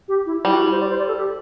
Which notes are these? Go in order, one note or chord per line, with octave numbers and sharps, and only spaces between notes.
G4
E4
G3 E4
F#4
E4
C5
D5
C5
D5
A4
G4